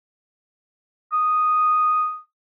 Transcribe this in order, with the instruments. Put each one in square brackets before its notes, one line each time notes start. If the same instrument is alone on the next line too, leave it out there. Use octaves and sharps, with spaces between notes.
[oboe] D#6